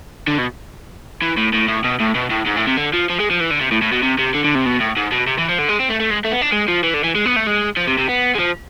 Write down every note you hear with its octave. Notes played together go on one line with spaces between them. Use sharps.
D3
B2
E3
A2
A2
A2
B2
A2
B2
A2
G#2
A2
C3
D3
F3
F3
G#3
F3
E3
D3
C3
A2
A2
B2
C3
C3
D3
D3
C3
B2
A2
G#2
B2
C3
E3
F3
D3
G#3
C4
A3
A3
G#3
A3
B3
D4
G#3
F3
E3
D3
E3
G#3
B3
A3
G#3
F3
C3
C3
B3
G#3
F3